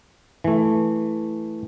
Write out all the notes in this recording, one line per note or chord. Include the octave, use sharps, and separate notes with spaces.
E3 A3